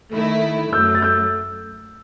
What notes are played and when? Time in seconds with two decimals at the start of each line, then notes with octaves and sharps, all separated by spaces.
0.13 D#3 A3 E4
0.72 F#2 F#3 A3 E6 G6
0.95 A6
1.02 E6 G6